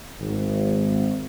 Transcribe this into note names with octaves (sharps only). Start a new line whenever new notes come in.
G#1